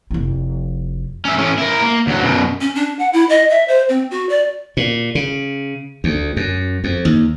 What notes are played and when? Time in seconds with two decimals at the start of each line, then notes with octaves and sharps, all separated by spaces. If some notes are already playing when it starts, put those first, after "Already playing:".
0.10 F1 E4
1.25 C#4 E5
1.38 A2 C#4
1.58 E4 A#4
1.82 A#3
2.07 D2 F#3
2.23 F#2 B2
2.61 C#4
2.75 D4
2.99 F#5
3.13 E4
3.29 D#5
3.50 E5
3.68 C5
3.89 C4
4.11 F#4
4.29 D5
4.77 A#2
5.15 C#3
6.04 D2
6.37 F#2
6.84 F2
7.05 D#2